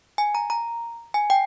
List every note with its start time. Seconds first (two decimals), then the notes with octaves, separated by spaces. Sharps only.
0.18 G#5
0.35 A#5
0.50 A#5
1.14 G#5
1.30 G5